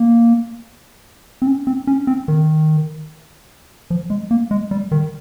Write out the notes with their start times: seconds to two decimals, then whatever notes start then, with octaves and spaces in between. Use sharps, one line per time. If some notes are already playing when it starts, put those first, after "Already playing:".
Already playing: A#3
1.42 C4
1.47 C#4
1.67 C4
1.87 C#4
2.07 C4
2.28 D#3
3.90 F3
4.10 G#3
4.31 A#3
4.51 G#3
4.71 G3
4.92 D#3